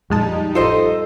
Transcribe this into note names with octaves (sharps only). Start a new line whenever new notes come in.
A#1 F2 G3 G#3 D#4 A5
A1 F4 A4 C5 D#5